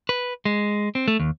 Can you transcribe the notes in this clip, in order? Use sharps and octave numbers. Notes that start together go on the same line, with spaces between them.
B4
G#3
C4
A3
D#2